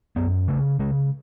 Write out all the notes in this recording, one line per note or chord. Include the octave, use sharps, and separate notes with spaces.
F#2 B3
C#3 A3
C#3 G#3